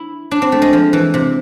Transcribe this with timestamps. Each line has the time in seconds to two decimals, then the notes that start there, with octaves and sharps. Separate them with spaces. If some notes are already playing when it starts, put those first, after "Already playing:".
Already playing: E4
0.31 D4
0.42 C4
0.52 A3
0.62 G#3
0.73 F3
0.93 E3
1.14 C3